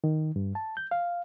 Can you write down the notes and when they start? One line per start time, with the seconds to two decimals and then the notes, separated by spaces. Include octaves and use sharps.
0.04 D#3
0.36 G2
0.55 A5
0.77 G6
0.91 F5